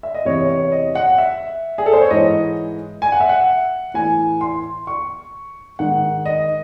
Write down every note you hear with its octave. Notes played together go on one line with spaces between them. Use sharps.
E5
D#5
E2 C3 E3 C#5
C#5
D#5
F#5
E5
G#4
A4
C5
C#5
G#2 E3 D#5
G#5
F#5
E5
F#5
A2 E3 G#5
C6
C#6
G#2 D#3 F#5
D#5